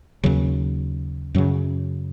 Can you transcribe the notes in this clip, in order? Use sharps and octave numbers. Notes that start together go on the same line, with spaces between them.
D#2 C#3 F#3
F#2 C#3 F#3